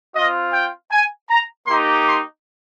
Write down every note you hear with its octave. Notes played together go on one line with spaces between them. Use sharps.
C4 F4 D#5
G5
G#5
A#5
A#3 D#4 G4 C6
C6